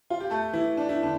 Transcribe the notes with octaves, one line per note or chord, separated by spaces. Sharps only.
F4
G4
A3 A4
E3 E4
D4
E4
D3 D4